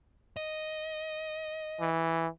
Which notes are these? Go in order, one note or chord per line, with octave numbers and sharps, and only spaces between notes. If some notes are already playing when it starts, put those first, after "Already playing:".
D#5
E3